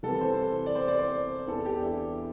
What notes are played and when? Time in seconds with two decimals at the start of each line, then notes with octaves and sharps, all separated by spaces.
0.03 C2 C3 E3 A4
0.21 C5
0.66 D5
0.75 C5
0.88 D5
0.99 C5
1.47 E2 E3 A4
1.65 G4
1.77 D4
1.83 E4